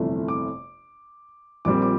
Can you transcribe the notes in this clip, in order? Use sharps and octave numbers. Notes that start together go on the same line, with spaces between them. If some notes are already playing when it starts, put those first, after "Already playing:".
Already playing: G1 F2 C3 E3 A3
D6
A#1 A#2 G3 C4 D6
D6